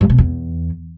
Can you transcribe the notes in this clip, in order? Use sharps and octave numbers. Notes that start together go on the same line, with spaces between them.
G2
B2
E2